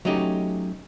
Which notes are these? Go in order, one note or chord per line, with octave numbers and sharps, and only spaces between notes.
F#3 A3 C#4 D#4 G4